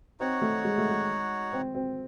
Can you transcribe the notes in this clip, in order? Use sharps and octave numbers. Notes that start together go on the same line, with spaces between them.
C4 D#4 F#4 C#5 F#5
A3
G#3
A3
G#3
C4
C4